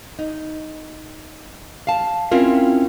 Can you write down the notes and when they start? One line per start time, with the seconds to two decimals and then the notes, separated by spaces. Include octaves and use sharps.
0.19 D#4
1.87 F5 A5
2.31 C4 C#4 E4 F4 A#4